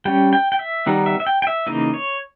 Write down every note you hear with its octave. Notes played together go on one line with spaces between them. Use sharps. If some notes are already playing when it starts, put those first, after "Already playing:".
G3 C#4 G5
G5
G5
E5
D#3 G3 B3 D#4
E5
E5
G5
G5
E5
C#3 E3 A#3 D#4 D#5
C#5